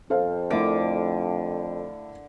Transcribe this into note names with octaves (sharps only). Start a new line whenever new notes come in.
F2 A4 C5 F5
D3 A3 E4 A#4 D6